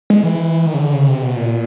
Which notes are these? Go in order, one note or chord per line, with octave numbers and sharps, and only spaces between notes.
G#3
E3
D#3
C#3
D3
C#3
C3
B2
A#2